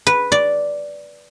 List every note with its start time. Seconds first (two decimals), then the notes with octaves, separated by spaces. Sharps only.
0.07 B4
0.32 D5